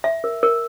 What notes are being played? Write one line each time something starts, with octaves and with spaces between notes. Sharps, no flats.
E5
A#4
A#4